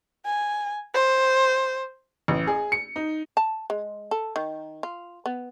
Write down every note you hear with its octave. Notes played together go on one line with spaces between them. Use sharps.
G#5
C5
A1
G#4
C#7
D#4
A5
G#3
A4
D#3
F4
B3